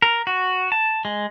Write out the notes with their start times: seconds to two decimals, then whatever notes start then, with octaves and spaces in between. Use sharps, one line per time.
0.02 A#4
0.27 F#4
0.72 A5
1.05 G#3